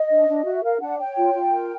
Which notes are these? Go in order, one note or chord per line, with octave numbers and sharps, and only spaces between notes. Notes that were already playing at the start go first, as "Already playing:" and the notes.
Already playing: D#5
D4
D4
F#4 E5
A#4 F5
D4 F#5
C#5 G5
F4
F4
A#4